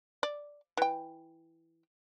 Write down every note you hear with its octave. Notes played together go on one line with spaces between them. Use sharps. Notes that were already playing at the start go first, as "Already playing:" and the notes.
D5
E3 G5